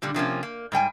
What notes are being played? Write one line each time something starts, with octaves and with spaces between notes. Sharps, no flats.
A#2 D3 G3
C3 F3 A#3 C#4
A#3
G#2 G3 G5 G#5